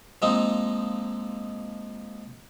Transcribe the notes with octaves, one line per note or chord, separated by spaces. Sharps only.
F3 G#3 A#3 C4 D#4